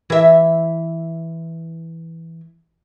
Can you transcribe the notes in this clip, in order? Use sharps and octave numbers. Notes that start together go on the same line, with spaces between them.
E3 E5